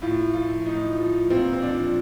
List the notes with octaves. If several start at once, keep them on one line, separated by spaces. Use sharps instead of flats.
A2 F4
F3 F4
A2 D#4
F3
A#2 C4
C4
F3 D4